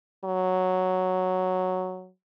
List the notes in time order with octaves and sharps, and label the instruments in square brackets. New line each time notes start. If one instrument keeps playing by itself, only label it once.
[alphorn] F#3